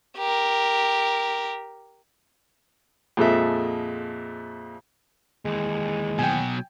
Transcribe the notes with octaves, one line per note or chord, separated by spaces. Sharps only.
G4 A#4
F2 A#2 G#3 A4 E5
D#2 E3 G#3
B2 F#3 G5 G#5